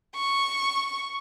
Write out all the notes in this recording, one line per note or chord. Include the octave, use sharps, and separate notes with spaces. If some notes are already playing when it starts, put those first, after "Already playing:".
C#6